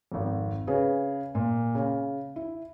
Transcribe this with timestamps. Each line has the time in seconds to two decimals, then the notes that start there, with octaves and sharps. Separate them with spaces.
0.12 G#1 F2
0.67 C#3 G#4 B4
1.35 A#2
1.75 C#3
2.36 E4